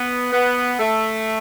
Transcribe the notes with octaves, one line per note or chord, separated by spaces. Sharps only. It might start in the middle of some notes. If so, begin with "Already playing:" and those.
Already playing: B3
B3
A3